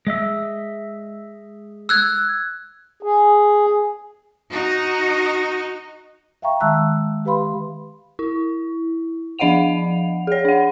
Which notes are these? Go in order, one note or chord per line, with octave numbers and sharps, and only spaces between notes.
G#3 D#5 E5
E6 F#6 G#6
G#4
D#4 F#4
E5 F5 G5 A#5 C#6
D#3 G#3 E5 A5 E6 F#6
G4 B4 F5 B5 C6
E4
F3 D4 D#5 F5 F#5 F7
G#4 C#5
D4 F#5